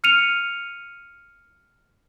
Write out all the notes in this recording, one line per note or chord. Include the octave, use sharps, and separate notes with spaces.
F6 C#7 D#7 F7